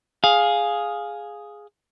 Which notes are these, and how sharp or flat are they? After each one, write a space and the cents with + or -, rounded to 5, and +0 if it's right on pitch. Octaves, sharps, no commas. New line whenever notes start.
G#4 +0 F5 +10